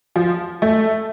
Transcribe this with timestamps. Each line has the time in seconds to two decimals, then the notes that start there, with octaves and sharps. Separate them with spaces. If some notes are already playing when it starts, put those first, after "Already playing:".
0.16 F3
0.62 A3